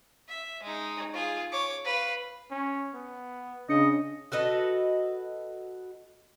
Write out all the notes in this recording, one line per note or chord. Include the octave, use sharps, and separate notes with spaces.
E5
G#3 D#4
F4 G#4
C#5 D6
B4 F5
C#4
B3
C#3 D4 D#5 C#7
F#4 A4 B4 D#5